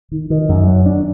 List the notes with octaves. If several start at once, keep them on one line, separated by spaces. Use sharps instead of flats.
D#3
D#3
F#2
F#3
D4